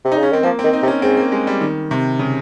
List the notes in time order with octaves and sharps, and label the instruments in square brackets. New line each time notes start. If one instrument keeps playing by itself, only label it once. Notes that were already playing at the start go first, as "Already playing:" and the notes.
[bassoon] C3
[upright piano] D#4
[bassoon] C#3 [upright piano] C#4
[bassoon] D#3 [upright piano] C4
[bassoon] F3 [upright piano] A#3
[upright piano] C4
[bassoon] D#3
[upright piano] D#4
[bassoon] C3
[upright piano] C#4
[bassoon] G#2 [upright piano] C4
[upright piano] A#3
G#3
G3
D#3
C3
C#3